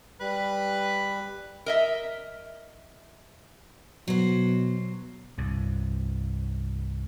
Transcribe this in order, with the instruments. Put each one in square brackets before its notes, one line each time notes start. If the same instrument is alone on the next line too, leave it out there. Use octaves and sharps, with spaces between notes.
[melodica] G3 [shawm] B4
[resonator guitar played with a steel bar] A#4 D#5 E5
[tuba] B2 [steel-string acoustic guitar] F#3 C5
[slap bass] C2 G2